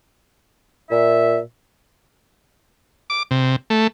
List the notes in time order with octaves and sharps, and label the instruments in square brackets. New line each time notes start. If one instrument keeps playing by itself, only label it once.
[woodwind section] A#2 E5
[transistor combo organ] D6
C3
A3